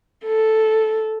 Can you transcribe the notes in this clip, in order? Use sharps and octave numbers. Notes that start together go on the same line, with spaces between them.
A4